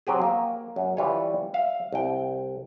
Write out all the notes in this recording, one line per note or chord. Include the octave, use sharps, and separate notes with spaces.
F#3 C4 G4 G#4
A#3
F#2
E3 G3 F4 C#5
E5 F5
C2 G5